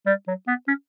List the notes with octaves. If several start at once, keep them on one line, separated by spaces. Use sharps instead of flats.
G3
F#3
B3
C#4